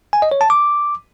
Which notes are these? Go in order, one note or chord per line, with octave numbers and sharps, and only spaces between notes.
G#5
D#5
C#5
A5
D6